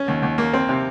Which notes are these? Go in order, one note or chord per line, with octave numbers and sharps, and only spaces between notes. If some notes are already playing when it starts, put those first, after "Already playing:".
Already playing: C#4
D#2
D#2
A#3
C4
C3